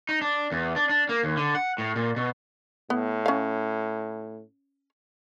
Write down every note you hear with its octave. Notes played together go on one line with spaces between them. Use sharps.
D#4
D4
E2
D4
D4
A#3
D#2
D3
F#5
A2
A#2
B2
A2 B3
C#4 F5